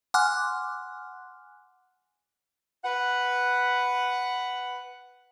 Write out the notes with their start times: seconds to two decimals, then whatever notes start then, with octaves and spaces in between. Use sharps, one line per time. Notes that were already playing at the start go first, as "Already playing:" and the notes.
0.14 F#5 G#5 C6 D6 F6 F#6
2.84 B4 F#5